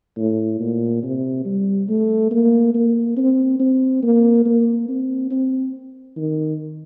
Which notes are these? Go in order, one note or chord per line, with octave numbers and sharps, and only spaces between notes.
A2
A#2
C3
G3
A3
A#3
A#3
C4
C4
A#3
A#3
C4
C4
D#3